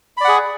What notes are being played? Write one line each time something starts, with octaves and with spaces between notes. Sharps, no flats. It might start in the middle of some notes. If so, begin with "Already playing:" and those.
G#4 D5 F#5 B5